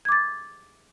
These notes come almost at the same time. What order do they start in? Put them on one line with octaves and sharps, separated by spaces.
G#6 D6 A6